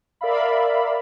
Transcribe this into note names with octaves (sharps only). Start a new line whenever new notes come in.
A#4 D5 E5 F5 B5